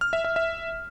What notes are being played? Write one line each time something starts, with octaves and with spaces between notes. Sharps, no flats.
F6
E5
E5
E5